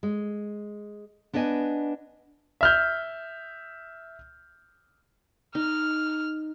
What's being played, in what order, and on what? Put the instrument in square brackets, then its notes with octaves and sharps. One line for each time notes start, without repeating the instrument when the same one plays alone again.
[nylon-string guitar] G#3
B3 D4 B4 D#5 G#5
[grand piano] E5 F6 G6
[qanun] D#4 [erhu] F6